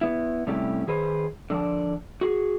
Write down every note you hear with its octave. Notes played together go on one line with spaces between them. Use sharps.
B3 E4
C3 G3 A3 C#4 E4 G4
D#3 G#4 B4 C5
D3 F3 D4
F#4 G#4